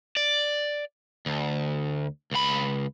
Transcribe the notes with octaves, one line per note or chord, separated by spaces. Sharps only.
D5
D2
C#2 B5